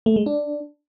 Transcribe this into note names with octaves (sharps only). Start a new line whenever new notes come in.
A3
G#3
D4